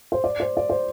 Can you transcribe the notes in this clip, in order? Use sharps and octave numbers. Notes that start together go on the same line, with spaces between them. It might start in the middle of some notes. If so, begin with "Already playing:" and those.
C5
D5
C5
D5
C5